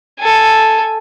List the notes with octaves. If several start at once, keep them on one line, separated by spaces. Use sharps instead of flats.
A4 G#5